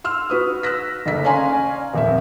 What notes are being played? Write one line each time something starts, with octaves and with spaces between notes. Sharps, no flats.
C6 E6 F6
F#4 B4 D#6
E6 F#6 A#6 B6
F#1 D2 B6
C#4 D5 F5 G#5 A#5 C6
D#1 F2 E5